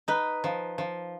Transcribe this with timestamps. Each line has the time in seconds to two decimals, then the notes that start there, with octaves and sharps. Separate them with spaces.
0.08 D#4 B4
0.44 F3
0.78 F3